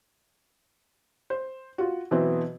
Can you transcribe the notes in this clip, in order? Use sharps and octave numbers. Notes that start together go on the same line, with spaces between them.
C5
F4 F#4
B2 E3 F#3 B3 C4